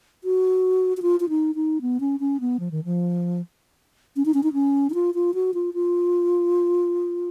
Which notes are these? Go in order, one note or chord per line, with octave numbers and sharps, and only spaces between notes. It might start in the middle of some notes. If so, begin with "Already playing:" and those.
F#4
F#4
F4
F4
D#4
D#4
B3
C#4
C#4
B3
F3
D#3
F3
C#4
D#4
C#4
D#4
C#4
D#4
F4
F4
F#4
F4
F4